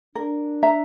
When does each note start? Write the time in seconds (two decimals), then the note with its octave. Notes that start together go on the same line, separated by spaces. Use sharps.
0.15 D4 A#4
0.63 E5 A#5